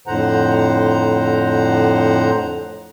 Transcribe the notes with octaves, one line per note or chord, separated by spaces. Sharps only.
F2 A2 D3 C5 F#5 A#5